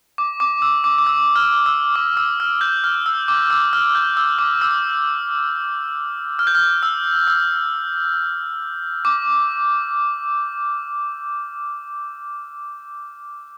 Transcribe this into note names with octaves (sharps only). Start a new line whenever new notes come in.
D6
D6
E6
D6
D6
E6
F6
E6
D6
E6
F6
G6
F6
E6
D6
E6
F6
G6
E6
D6
E6
F6
G6
F6
E6
E6
D6